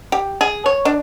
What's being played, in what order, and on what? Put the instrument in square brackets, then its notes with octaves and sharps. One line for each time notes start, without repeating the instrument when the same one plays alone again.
[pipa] G4
G#4
C#5
D4